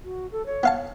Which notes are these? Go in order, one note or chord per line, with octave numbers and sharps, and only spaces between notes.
F#4
A4
C#5
B3 F5 A5